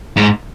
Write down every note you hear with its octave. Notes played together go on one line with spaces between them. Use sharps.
G#2